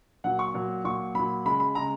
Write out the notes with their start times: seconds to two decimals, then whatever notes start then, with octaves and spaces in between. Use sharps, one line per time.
0.24 A#2 F#3 F#5
0.39 C#6
0.54 A#2 F#3
0.85 A#2 F#3 C#6
1.15 A#2 F#3 B5
1.45 C#3 G#3 B5
1.60 B5
1.75 C#3 G#3 A#5